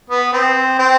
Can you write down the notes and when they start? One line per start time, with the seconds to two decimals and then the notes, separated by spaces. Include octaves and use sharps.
0.10 B3
0.33 C4
0.79 C4